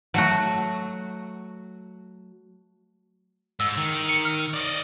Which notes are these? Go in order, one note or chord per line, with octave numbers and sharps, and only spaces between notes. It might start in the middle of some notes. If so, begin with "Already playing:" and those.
F#3 A3 F#4
G#2 E6
D#3
C#7
F6
D5 D#5